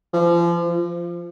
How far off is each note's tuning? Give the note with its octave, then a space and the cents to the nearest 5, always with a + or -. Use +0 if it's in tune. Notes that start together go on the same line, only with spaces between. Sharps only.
F3 -35
F3 -15